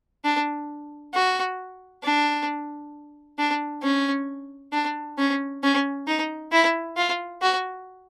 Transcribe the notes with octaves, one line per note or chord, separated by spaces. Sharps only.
D4
F#4
D4
D4
C#4
D4
C#4
C#4
D#4
E4
F4
F#4